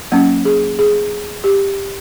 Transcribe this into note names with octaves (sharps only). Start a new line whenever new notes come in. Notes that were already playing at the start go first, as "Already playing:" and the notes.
F#3 A#3 C#4
G#4
G#4
G4